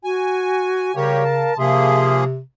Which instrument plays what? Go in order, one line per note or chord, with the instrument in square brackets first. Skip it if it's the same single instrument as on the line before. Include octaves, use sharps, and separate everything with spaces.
[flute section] F#4 [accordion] G#5
[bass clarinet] C#3 [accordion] G3 G4 C#5 [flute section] A#4 F5
[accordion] A5
[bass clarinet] C3 [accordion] F3 A#3 G#4 [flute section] E5 C6